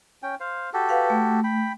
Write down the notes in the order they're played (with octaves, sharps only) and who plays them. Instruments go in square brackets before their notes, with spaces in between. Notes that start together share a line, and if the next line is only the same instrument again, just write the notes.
[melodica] C#4 G5
C5 F5
F#4 G4 A4
[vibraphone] B4 F5 F#5
A3
[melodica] G5 B5